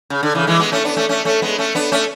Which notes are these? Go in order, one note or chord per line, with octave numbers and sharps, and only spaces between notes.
C#3
D3
C#3 E3
E3 G#3
G#3 B3
A3 C#4
B3 D4
A3 C#4
A3 C#4
A3 C#4
G#3 B3
A3 C#4
B3 D4
A3 C#4